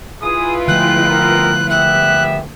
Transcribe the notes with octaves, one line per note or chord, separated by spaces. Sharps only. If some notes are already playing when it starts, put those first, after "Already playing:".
E4 F4 G#4 B4 D#6
D3 F3 G#3 A3 G5 F#6
B3 C4 A#4
B3 G4 E5 F#6